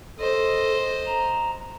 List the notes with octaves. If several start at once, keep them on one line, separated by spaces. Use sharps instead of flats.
A4 C5 D#5
A#5